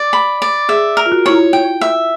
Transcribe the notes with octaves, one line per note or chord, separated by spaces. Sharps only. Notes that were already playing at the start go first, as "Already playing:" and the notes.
Already playing: D5
B5
D5
G#4 E5
A#4
F4
F#4
E4 C#5
F4
G5
E5